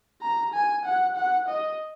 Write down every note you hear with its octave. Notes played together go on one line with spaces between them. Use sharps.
A#5
G#5
F#5
F#5
D#5